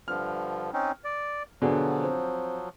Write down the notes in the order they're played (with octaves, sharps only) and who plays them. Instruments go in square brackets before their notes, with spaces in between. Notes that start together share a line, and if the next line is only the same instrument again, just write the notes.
[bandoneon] G2 D3 F3 [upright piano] F6
[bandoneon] C4 C#4 D#4
D5
[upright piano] B2 D3 G#4 [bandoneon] F3 F#3
[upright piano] C4